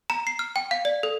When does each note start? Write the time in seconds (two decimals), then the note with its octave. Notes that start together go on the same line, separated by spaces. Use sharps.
0.10 A#5
0.27 C7
0.39 F6
0.56 G5
0.71 F5
0.85 D5
1.03 A4